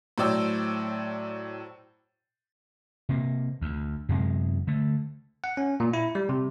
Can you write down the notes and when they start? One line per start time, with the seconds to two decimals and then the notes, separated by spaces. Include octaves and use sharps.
0.18 A2 F#3 C5 D5 G5 E6
3.09 C3 A#3
3.61 D2
4.09 F#2 C3 G#3
4.67 D3 A3
5.44 F#5
5.57 C#4
5.80 A#2
5.93 E4
6.15 G3
6.29 C3